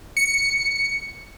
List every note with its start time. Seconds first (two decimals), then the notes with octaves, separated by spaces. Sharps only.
0.17 C#7